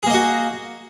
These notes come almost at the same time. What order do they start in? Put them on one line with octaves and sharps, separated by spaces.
G#4 A#3 D#5 F#4